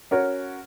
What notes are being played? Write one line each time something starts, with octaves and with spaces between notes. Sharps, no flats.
C#4 F#4 A#4 C#5